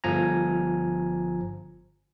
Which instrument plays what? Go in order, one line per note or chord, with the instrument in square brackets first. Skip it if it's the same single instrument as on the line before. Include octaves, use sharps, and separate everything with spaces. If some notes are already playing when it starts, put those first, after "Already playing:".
[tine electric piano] G1 F3 G#5 A#5